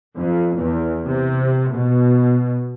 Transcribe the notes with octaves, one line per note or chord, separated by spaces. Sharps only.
F2
E2
C3
B2